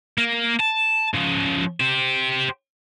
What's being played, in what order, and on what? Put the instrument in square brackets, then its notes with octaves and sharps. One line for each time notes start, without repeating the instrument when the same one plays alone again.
[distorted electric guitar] A#3
A5
C#3 F3
G4 C5